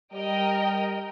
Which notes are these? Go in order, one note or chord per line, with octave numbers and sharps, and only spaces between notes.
G3 A#4 D#5 G5